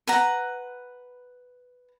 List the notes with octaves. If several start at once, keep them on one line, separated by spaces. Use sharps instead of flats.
B4 F#5 A#5